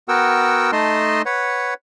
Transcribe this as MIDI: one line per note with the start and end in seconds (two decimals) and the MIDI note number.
0.09 0.71 59
0.09 0.71 66
0.09 0.71 70
0.09 0.71 78
0.09 0.71 79
0.09 0.71 88
0.72 1.22 57
0.72 1.22 63
0.72 1.22 75
0.72 1.22 81
0.72 1.22 84
1.26 1.74 71
1.26 1.74 73
1.26 1.74 78